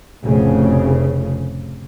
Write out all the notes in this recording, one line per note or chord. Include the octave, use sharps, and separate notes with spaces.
F1 A2 C#3